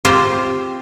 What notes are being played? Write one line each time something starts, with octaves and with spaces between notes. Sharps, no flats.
C4 F4 G4 C5